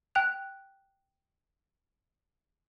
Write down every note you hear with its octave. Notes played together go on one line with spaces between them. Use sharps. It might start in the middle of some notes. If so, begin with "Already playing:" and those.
G5 F#6 F7